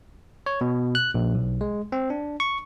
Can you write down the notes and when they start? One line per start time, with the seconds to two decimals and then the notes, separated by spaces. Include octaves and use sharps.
0.46 C#5
0.61 B2
0.95 F#6
1.14 A#1
1.34 B1
1.61 G#3
1.92 C4
2.10 D4
2.40 C#6